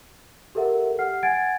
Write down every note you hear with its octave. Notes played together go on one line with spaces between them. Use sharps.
G4 A4 A#4 E5 F#5
G4 F#5 F6 C7
F#5 G#5 G#6 A6 D7